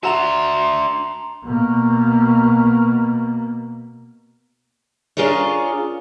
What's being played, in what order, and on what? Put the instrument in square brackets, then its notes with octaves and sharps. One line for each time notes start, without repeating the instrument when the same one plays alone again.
[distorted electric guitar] D4 E5 [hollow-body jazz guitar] F#4 F#5 [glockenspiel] A5 A#5 F7 [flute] C6
[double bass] B2 A#3
[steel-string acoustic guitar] D4 F4 G#4 A#4 C#5